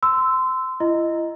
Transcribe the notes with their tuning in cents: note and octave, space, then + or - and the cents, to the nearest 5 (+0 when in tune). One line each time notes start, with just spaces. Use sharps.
C6 -25 E6 +0
E4 +40 D#5 +0